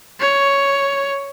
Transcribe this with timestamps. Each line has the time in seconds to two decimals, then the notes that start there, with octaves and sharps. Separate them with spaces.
0.21 C#5